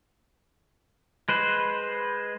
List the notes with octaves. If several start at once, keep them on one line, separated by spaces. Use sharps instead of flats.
G#3 B4 C5